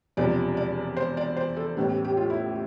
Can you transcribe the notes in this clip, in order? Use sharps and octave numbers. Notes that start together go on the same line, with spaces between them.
E1 E2 C3 F3 D5
D5
C5
D5
C5
A4
A1 A2 G3 B3
G4
F4
E4